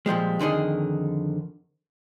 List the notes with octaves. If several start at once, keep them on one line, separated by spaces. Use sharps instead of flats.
A#2 F3 G3 G#3
F2 D3 D#3 G#4 D#5